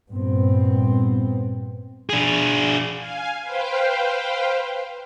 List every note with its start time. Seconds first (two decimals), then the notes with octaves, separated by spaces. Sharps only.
0.11 G2 A#2 B3 C4
2.10 D4 G#4
2.98 F5 G#5
3.42 B4 C5 F5 G5